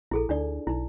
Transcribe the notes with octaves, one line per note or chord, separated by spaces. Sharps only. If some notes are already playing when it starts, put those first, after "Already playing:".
A#1 E4 G#4 A4
D2 D4 D#4 D5
B1 D#4 E4